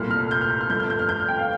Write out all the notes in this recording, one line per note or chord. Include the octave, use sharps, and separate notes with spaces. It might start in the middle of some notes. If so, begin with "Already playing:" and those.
Already playing: C2 A#2 A3 F6
F6
G6
F6
G6
F6
G2 D3 F3 A3 G6
G6
G6
F6
G6
F6
G5
F5